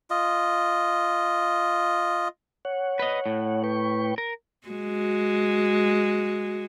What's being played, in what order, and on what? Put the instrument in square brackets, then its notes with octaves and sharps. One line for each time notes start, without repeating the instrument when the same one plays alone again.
[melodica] F4 D#5
[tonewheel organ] C#5 F#5
[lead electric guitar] B4 D#5
A2
[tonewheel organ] B4 G5 C#6
[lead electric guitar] A#4
[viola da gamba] G#3 F#4